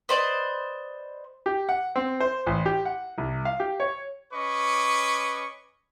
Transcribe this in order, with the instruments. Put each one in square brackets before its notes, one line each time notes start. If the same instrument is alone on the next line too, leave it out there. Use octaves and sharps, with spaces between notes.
[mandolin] B4 C5 D5 D#5
[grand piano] G4
F#5
C4
C5
A1
G4
F#5
C2
F5
G4
C#5
[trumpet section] C#4 B4 D#5 C#6 D6